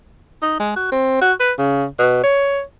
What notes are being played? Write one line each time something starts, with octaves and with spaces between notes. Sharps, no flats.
D#4
G#3
F#4
C4
F#4
B4
C#3
B2
C#5